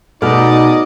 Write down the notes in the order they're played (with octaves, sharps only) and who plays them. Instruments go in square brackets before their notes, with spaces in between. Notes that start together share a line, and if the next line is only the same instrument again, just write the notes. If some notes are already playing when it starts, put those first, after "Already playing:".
[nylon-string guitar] B2 [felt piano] A3 G#4 F6 [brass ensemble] D#4 [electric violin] D5 D#5